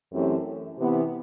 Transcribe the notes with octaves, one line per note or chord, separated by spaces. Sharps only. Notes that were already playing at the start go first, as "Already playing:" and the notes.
F#2 E3 A3 C4 G4
C3 E3 B3